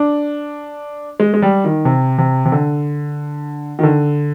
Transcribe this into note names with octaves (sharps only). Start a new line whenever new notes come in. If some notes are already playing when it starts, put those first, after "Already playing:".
Already playing: D4
G#3
G#3
G3
D#3
C3
C3
C3
D3
D#3
D3